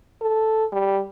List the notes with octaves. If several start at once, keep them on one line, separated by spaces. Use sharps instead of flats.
A4
G3